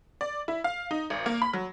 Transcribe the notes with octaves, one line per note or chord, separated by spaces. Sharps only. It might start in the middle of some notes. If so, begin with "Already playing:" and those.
D5
E4
F5
D#4
G#1
A#3
B5
F#3